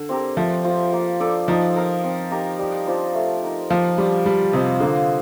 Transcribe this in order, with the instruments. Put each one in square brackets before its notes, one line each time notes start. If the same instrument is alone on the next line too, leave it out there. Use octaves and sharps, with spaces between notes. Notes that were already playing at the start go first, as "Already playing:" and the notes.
Already playing: [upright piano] D3 [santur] D4
[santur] C4 G4 A#4
[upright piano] F3 [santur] A3
[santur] C4 F4
A#3
D4 A4 D5
[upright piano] F3 [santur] D#4
[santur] A#4 F5
C4
D#4 G4 A#4
G3
D4 F4 C5
A3
D#4 A#4
[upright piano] F3 [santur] A#3
[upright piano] G3 [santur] D4 F4
[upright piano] G3 [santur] D4
[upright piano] C3 [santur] F4 C5 D#5
[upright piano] D3 [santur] A#3